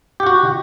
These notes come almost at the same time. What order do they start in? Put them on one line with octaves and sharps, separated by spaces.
G4 F#5 F#4